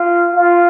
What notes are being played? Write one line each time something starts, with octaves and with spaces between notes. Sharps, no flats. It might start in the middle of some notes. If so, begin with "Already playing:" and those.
Already playing: F4
F4